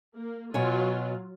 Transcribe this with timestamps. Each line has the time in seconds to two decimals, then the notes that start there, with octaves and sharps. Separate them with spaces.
0.15 A#3
0.54 B2 F#3 F4 C#5 G#5